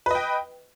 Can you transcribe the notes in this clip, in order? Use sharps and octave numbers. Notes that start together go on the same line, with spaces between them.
B4 D#5 G5